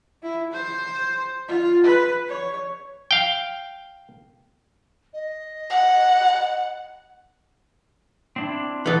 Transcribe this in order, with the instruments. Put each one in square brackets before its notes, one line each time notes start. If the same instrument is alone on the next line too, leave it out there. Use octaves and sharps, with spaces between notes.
[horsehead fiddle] E4
C5
F4
B4
C#5
[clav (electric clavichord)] F5 G5
[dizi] D#5
[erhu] F#5
[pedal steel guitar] C4 D4 E4
[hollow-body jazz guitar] E3 A4 [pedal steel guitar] D#5 F#5